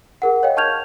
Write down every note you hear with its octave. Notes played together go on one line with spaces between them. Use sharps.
G#4 A#4 F#5
C#5 D#5 F5 G5
A5 C#6 F6 G6 G#6 F7